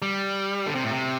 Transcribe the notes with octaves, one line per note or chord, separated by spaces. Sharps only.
G3
D3
C3
A2
C3